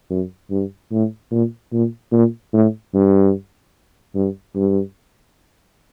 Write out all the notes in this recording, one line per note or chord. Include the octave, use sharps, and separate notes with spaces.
F#2
G2
A2
A#2
A#2
A#2
A2
G2
G2
G2